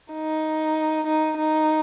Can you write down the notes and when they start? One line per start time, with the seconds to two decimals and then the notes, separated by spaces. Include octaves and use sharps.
0.13 D#4
1.06 D#4
1.38 D#4